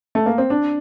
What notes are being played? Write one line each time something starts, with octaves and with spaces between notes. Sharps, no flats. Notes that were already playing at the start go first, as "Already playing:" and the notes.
A3
A#3
C4
D4